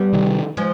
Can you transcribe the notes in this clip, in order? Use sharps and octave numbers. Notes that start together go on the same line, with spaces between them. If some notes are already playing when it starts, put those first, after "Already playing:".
Already playing: G3 B3
C3 D#3
F3 G#3